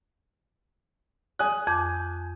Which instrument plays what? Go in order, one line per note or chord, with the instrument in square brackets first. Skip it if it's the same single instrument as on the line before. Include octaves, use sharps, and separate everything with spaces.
[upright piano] G#5 D#6 F#6
[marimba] F2 D6 G6